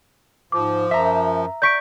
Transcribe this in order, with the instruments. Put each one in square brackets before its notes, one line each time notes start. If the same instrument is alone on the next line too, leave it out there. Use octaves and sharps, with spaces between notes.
[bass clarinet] G#2 [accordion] F3 [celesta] D6
[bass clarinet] F#2 [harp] E5 A#5
[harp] D5 C#6 [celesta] G6 B6 D7